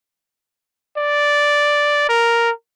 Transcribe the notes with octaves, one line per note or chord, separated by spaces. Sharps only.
D5
A#4